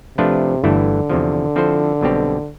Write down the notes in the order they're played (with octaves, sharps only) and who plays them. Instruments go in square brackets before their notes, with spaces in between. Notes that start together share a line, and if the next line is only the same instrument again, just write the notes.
[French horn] C3 [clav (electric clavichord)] F3 A3 D4 F4 B4
[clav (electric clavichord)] G1 G2 E3 A3 E4 [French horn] D3
[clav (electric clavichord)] E2 C3 F3
F3 C4 E4 A4 C5
B1 B2 G3 C4 G4